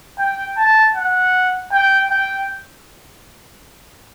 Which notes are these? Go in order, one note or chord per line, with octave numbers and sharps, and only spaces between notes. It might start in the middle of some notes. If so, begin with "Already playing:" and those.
G5
A5
F#5
G5
G5